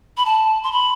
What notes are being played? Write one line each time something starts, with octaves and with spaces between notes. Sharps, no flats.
B5
A5
C6
B5